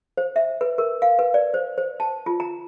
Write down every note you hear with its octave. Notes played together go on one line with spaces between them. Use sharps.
C5
E5
B4
A#4
F5
B4
D5
C5
C5
A5
F4
A#5